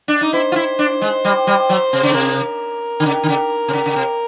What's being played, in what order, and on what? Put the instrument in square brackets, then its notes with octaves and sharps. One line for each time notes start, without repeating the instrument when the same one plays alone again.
[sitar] D4
D#4
[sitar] E4 [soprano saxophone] C5
[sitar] F4
E4
D4
G#3
G3
G3
F#3
C3
C#3
[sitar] C3 [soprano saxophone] A#4
[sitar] D3
C#3
D3
C#3
C3
C#3
C#3
C3